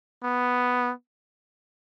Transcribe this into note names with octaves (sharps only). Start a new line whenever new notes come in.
B3